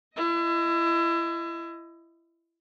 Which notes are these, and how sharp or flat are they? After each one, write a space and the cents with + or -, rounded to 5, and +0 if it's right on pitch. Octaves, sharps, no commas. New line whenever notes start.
E4 +30 D#5 +10